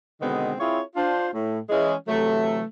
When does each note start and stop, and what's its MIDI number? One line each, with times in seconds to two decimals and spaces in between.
0.21 0.53 47
0.21 0.53 50
0.21 0.53 51
0.21 0.53 56
0.21 0.53 59
0.21 0.53 60
0.59 0.81 60
0.59 0.81 64
0.59 0.81 65
0.59 0.81 68
0.59 0.81 73
0.96 1.28 62
0.96 1.28 65
0.96 1.28 72
1.33 1.59 45
1.70 1.94 52
1.70 1.94 56
1.70 1.94 61
2.08 2.63 48
2.08 2.63 52
2.08 2.63 54
2.08 2.63 57